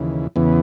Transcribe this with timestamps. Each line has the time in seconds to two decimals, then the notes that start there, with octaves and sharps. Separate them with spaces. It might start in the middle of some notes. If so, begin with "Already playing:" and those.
Already playing: D#2 C#3 E3
0.36 E2 C#3 E3 B3